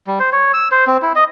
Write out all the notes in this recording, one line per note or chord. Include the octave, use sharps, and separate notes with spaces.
G3
C5
C#5
E6
C5
C4
E4
D#5